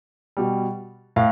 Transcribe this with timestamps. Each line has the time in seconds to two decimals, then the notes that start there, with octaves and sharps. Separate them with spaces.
0.37 B2 G3
1.16 A2 F5